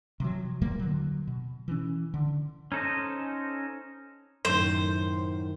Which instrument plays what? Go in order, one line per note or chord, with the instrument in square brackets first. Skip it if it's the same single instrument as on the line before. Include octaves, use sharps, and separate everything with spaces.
[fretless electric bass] C3 F3 F#3
E2 A#2 G3 A#3
D3 F#3
B2
E3 C#4
D3
[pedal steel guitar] C#4 D#4 A4 C5 D#5
[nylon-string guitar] F#2 A2 D#3 [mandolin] C5